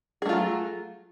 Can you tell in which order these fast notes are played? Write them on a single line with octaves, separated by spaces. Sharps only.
G#4 A3 F4 F#3